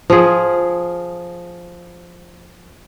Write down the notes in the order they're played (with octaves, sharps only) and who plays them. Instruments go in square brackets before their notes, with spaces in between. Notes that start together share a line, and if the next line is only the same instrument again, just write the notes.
[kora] F3 G#4